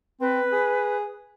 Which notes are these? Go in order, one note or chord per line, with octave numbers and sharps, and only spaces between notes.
C4 B4
G#4